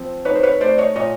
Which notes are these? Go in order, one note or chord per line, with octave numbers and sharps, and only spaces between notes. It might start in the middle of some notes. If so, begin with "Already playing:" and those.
Already playing: F3 C4
D#4 B4 C#5
C5
B4 C#5
A3 C5 D5
C#5 D#5
A#2 C#5 D#5